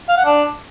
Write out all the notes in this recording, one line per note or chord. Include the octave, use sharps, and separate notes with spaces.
F5
F#5
D4